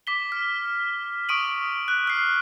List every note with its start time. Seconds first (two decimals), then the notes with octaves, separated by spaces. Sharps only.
0.07 D6 B6 G7
0.32 F6
1.29 C#6 D#6 D7 D#7 F#7
1.88 F#6
2.07 F6 C7